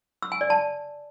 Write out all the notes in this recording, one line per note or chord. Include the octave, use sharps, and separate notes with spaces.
E6
G#5
D5
A5